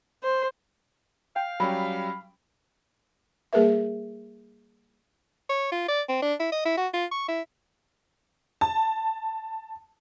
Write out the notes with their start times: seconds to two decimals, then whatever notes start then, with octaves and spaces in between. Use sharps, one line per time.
0.24 C5
1.36 F5 G5
1.60 F#3 G3 C#4 B5
3.53 G3 A#3 G#4 A#4 B4 E5
5.50 C#5
5.72 F4
5.88 D5
6.09 C4
6.22 D4
6.40 E4
6.52 D#5
6.65 E4
6.77 F#4
6.93 F4
7.11 C#6
7.28 E4
8.61 A5